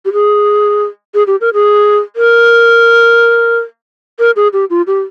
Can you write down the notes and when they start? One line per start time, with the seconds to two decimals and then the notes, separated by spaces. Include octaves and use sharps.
0.05 G4
0.13 G#4
1.14 G#4
1.27 G4
1.41 A#4
1.54 G#4
2.16 A#4
4.19 A#4
4.36 G#4
4.53 G4
4.70 F4
4.87 G4